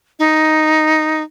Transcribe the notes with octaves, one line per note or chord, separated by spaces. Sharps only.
D#4